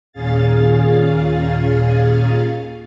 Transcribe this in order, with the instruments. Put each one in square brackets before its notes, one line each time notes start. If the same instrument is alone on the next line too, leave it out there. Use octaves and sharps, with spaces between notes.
[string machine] D#2 A#2 C#4 G#4 F5 A6